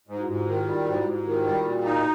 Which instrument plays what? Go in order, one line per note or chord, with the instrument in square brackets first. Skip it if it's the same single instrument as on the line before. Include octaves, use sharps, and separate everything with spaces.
[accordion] G#2
[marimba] E4 F#4
[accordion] G#2 [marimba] F4 G4
[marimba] F#4 G#4
[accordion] D#3 [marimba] F4 G4
[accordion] G3 [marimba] F4 G4
[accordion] G#2 [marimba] E4 F#4
[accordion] G#2
[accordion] D#3 [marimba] F4 G4
[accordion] G3
[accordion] A#2 [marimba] F#4 G#4
[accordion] D#4